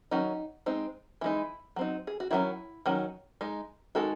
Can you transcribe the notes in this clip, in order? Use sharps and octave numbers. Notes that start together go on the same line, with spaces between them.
D#3 F#3 C#4 D#4
G#3 C4 D#4
E3 G#3 D#4 E4
F#3 C4 D#4
G#4
F#4
D#3 F#3 C#4 E4
D#3 F#3 C#4
G#3 D#4
D#3 G#3 D#4 F#4 A4